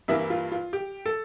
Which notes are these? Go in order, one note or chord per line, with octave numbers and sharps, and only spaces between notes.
G2 E3 G3 A#3 E5
F4
F4
G4
A4